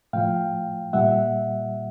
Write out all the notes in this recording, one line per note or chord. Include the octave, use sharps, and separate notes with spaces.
A2 F3 F5 G5
A#2 G3 E5 F#5